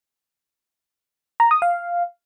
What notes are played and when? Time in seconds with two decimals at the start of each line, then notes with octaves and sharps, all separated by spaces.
1.40 A#5
1.51 D#6
1.62 F5